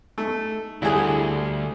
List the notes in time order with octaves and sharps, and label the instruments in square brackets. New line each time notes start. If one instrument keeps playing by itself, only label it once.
[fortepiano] A3 [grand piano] D#4
[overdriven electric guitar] D2 [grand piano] D3 G3 A3 [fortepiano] E4 G#4